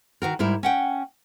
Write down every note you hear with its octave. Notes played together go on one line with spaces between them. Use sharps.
D#3 E3 F#4 A#4
G#2 G3 E4 A#4
C#4 F#5 G5